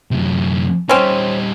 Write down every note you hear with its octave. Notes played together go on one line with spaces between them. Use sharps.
F#2 C3
G3 C4 C#4 D#4